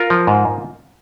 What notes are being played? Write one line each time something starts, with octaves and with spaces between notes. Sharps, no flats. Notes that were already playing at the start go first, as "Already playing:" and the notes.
Already playing: F4 A#4
F3
G#2